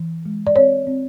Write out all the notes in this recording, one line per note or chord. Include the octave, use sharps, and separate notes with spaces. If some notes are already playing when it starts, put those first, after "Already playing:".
Already playing: E3
G#3
D5
C4 C#5
C4